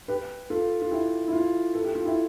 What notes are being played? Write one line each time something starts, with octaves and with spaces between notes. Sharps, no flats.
G4 B4
F4 A4
F4
E4 G4
E4
F4
A4
G4
F4
E4 G4